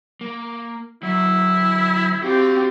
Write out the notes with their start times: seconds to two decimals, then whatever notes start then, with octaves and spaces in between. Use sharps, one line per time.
0.21 A#3
1.03 D3 F#3 E4
2.22 C4 F#4 G4 F5